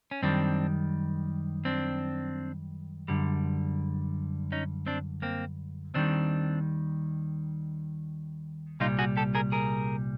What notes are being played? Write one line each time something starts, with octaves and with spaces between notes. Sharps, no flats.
C#4
F#2 D#3 G3 C4 D4
C4 D4
F#2 D3 G3
C#4 D#4
C4 D4
A#3 C4
D#2 D#3 G3 C4 D4
C2 A#2 G3 D#4 F4
F#4 G#4
G4 A4
G#4 A#4
G#4 A#4